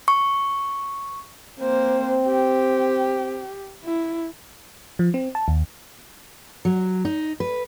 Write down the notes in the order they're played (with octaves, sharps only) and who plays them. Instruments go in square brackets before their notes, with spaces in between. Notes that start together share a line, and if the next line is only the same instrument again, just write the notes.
[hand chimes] C#6
[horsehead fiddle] A#3 C5 [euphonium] C4
[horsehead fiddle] G4
E4
[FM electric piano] F3
C4
A5
D#2
[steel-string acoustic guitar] F#3
D#4
B4